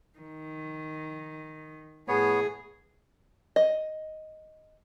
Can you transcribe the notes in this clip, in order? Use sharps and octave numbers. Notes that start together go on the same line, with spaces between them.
D#3
A2 B3 G#4 C#5
D#5